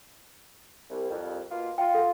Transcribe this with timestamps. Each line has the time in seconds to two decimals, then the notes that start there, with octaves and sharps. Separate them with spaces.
0.89 C2
1.10 C2 F2
1.51 B2 A#3 F4
1.78 F4 G5
1.95 A4 F#5